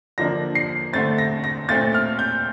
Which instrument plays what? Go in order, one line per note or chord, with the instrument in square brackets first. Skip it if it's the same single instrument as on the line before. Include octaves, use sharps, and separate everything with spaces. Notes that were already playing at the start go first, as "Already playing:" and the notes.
[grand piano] D3 F3 A#3 D4 A#6
C7
D3 A3 C4 A6
A#6
A#6
A#2 A3 C4 A6
F6
G6